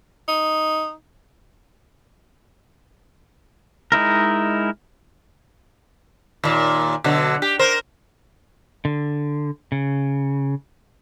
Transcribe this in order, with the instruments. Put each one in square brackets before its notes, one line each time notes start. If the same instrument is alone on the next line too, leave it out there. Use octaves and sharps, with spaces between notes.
[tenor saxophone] D#4
[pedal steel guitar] G#3 D#4 E4 A#4
[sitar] D#2 A#2
B2 D3 F#3
G4
A#4 C5
[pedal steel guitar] D3
C#3